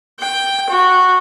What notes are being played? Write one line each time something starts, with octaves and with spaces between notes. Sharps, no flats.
G5
F#4